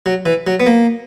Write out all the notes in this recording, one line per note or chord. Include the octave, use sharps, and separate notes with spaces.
F#3
E3
F#3
B3
A#3